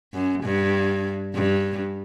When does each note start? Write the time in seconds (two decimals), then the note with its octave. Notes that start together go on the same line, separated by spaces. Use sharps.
0.13 F#2
0.44 G2
1.35 G2